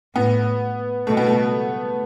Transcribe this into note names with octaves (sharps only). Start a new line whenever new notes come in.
A2 B3
B2 A3
B3
A3